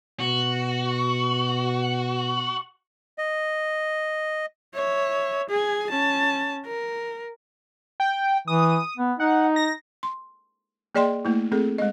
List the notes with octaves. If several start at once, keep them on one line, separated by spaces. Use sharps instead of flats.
B2 F#4
D#5
C#5 E5
G#4 G#5
C#4 A5
A#4
G5
E3 D#6
B3
D#4 F#5
A#6
C6
A#3 G#4 D5 D#5 G5 C6
A3 A#3 E4
A3 C4 G#4 A4
G#3 D#5